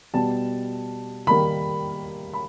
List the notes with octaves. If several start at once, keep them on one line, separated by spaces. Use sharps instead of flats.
B2 G3 B3 A5
D#3 G3 A#3 B5
B5